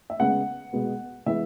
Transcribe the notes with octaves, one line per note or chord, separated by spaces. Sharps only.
E5
C#3 G#3 B3 F#5
B2 G#3 B3
E3 G#3 B3 E5